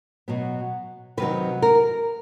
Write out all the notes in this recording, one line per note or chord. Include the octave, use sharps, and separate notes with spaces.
B2 F#3 B3
C3 D#3 F#3 B4
A#4